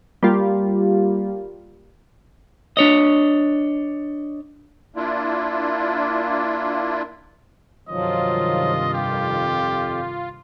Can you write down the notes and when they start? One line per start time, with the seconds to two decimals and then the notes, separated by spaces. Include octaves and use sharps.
0.23 G3 A#3 F4
2.77 D4 C#5 D#5
4.96 A#3 D4 E4 F4
7.89 G2 C3 D#3 F3 F#3 F4 D#5
8.94 F2 G4